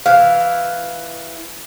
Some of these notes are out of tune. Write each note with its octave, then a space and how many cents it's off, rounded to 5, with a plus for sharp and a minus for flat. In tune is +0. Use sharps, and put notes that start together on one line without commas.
E3 +0 F5 +0